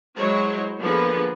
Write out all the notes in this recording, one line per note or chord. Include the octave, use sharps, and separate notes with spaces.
F#3 G#3 E4 C5 C#5
D3 F3 A#3 B3 G#4 B4